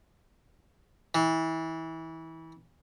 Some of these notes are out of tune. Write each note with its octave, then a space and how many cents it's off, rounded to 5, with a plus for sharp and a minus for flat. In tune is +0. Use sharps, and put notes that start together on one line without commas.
E3 -25